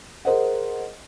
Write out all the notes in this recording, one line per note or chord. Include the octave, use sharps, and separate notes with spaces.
G#4 A#4 C5 D#5 F#5